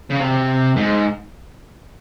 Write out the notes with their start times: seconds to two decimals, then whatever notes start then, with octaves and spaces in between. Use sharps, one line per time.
0.10 C#3
0.20 C3
0.76 G#2